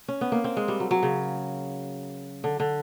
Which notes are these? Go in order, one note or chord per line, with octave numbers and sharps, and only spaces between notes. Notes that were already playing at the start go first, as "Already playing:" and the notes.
C#4
B3
A#3
C4
G#3
G3
F#3
F#3
C#3
D3
D3